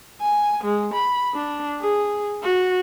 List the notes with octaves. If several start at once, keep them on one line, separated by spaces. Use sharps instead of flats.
G#5
G#3
B5
D4
G#4
F#4